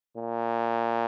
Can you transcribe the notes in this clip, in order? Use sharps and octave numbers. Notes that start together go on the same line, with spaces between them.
A#2